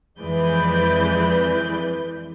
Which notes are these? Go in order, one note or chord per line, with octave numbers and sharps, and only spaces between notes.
F2 E3 G#3 B4 D5 G6